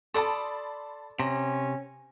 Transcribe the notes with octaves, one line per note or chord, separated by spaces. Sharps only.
A4 D5 A5 B5 C6 D#6
C3 C#4 A#6